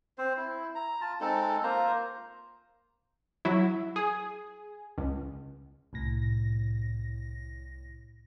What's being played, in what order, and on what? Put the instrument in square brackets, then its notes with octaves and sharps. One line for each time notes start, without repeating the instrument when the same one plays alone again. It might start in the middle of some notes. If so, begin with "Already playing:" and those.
[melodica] C4 C5
E4
A#5
F4 A5
G#3 C4 D#4 A4
A#3 F4 C5 A#5
[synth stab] F#3 E4
G#4
C#2
[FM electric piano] C2 A2 A#6